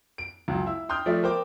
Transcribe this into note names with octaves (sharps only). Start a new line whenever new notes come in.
D7
C#2 F#2
E4 E6
G5 C6 D#6 F6 G6
F3 A3 D5 E5
A#4 C5 G5 D6